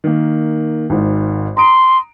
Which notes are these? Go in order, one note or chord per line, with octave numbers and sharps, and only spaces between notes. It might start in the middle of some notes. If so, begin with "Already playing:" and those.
D#3 A#3
G#1 G#2
A#5 C6 D#6 D7